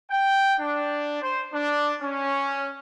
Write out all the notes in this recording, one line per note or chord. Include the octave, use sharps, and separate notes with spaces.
G5
D4
C5
D4
C#4